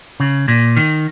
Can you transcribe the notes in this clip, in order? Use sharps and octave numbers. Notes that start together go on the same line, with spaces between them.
C#3
A#2
D#3